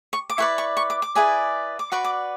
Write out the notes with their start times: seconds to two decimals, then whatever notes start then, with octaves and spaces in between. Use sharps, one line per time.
0.13 C#6
0.30 D6
0.38 E4 B4 D5 C#6
0.58 C#6
0.77 C#6
0.90 D6
1.02 D6
1.15 E4 G#4 B4 D5
1.79 D6
1.92 F#4 B4 D5 C#6
2.04 D6